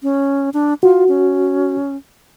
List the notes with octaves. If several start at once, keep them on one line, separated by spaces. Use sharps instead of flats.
C#4
D4
F4 F#4
C#4